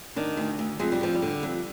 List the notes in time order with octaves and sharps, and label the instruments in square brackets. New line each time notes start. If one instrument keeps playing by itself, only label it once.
[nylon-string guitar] D#3 D4
D2
D2
F2 G#3
G3
F2 F3
G3
D3
F2